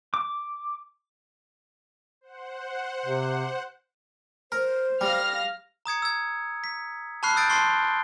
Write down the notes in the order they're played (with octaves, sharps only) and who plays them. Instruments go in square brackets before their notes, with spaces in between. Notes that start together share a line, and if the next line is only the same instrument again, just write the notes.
[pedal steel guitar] D6
[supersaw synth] C5 F#5
[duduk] C3
[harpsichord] A#4 [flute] C5
[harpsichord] G3 [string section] F5 F6 A#6
[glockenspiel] A#5 D#6 G#6 C#7
E6 G#6
B6
A5 B5 C#6 F6 F#6 C7
D#6 E6 G6 A6 D7
A5 C6 C#6 C7 G7